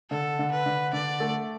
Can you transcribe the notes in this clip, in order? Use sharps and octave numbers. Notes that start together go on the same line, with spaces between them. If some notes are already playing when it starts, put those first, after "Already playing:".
D3 A4
D3
B4
D3
D3 D5
A3